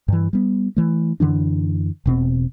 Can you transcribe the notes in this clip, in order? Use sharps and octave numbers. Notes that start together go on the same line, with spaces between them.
G2 E3
G3 B3
E3 A3
F#2 D3 E3 D4
E1 B2 C4